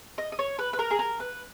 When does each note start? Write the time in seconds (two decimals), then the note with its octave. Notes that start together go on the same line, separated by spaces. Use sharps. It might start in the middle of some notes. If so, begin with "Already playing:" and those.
0.18 D#5
0.32 D#5
0.39 C#5
0.59 B4
0.73 B4
0.79 A#4
0.91 G#4
0.99 A#4
1.20 B4